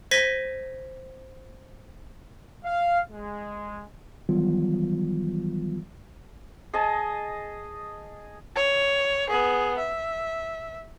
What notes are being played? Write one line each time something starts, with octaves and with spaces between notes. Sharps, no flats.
C5 G#6 A#6 B6 D#7 G7
F5
G#3
D#3 E3 F#3 G3 B3 F4
G#4 D#5 A5
C#5
B3 G#4
E5